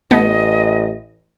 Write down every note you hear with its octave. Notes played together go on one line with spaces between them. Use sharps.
A1 A3 B3 D#5